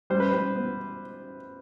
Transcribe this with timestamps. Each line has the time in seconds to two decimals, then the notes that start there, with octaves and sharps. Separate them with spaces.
0.10 G3 C5
0.20 B4
0.31 G3 C5
0.56 B3